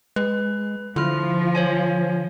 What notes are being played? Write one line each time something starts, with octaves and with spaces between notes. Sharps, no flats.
G#3 B4
D3 F3 E4 F4 F6
C5 C#5 G#5